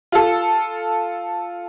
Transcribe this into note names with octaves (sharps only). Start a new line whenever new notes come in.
F4 A4